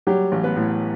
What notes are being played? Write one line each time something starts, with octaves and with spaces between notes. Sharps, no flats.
F#3 G3 G4
A1
B3 B4
A2